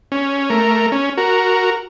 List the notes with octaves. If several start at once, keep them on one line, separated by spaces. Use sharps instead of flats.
C#4
A3 A#4
C#4
F#4 A#4